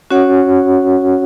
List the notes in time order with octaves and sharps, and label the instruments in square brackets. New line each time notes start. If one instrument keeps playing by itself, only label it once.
[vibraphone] C#4 F#4 C#5 F#5